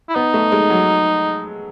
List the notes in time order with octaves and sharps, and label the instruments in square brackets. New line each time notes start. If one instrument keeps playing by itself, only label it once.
[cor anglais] E4
[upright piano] B3 [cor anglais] D#4
[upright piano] A3
G#3
F#3